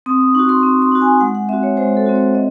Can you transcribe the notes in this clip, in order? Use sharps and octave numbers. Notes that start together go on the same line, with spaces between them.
C4 D#6
D#6
D#4 F#4 C#6
C6
C4
C6
D#4 F#4
G#5
G#3 F#5
F#5
C4 F#4 E5
C#5
G#3 C5
A4
C4 F#4
C#5
C4 D#5